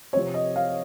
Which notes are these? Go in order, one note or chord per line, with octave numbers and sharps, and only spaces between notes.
C3 F3 C4 C#5
D#5
F5